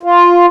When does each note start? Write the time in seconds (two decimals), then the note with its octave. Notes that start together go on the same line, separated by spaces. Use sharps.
0.03 F4